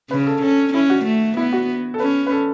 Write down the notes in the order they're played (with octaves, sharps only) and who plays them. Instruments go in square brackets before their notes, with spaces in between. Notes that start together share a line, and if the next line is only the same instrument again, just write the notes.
[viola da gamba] C#3 [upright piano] B4
[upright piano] A4
[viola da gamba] C#4 [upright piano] A4
[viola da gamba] C#4 [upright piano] E4
[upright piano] F#4
[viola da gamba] A3
[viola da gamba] B3 [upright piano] E4
[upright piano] F#4
A4
[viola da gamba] C#4 [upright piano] B4
[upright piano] B4
A4